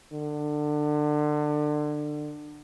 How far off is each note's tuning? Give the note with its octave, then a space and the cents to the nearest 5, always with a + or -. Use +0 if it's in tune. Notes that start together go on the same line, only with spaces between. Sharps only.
D3 +25